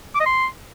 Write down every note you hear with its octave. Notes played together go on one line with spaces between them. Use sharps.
D6
D#5
C6